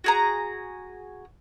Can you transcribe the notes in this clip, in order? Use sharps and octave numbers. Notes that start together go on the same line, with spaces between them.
F#4 G#4 A#5